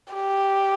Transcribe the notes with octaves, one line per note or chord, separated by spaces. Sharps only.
G4